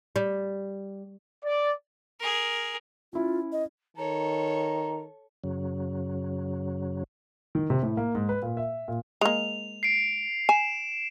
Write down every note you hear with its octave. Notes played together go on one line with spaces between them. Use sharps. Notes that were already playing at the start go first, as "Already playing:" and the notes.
G3
D5
G#4 A#4
C#4 E4 F4
D#5
D#3 A4 C#5 A#5
F#2 C#3 F#3
D#3
C3
A2
A#3
G#2
B4
A#2
E5
A#2
G#3 A#3 F7
C7 D7
G#5 E7